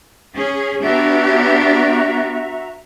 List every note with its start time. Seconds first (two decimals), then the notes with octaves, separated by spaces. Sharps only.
0.35 C#4 G#4
0.83 B3 D4 F#4 G4 E5 A#5